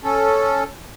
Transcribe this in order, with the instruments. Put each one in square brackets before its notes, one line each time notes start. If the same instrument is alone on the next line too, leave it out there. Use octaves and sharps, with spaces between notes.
[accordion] C#4 A4